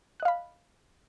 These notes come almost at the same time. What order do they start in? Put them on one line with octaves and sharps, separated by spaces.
F#6 D#5 F5 B5